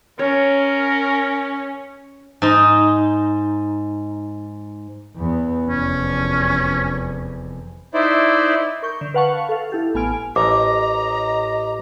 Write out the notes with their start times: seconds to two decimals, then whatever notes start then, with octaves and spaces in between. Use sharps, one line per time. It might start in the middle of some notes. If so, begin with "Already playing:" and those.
0.19 C#4 A#4 C#5
2.42 G#2 D#4
5.16 E2 B3
5.67 F1 E2 C#4
7.94 D#4 E4 C5 D5 E5
8.82 A#4 C#6 G6
9.01 D3
9.14 B4 F5 F#5 A5 C#6
9.49 A4 F5
9.70 E4 G4 A4
9.95 A1 B3 G#5 F6 D7
10.36 A1 A4 C5 D#5 A#5 D6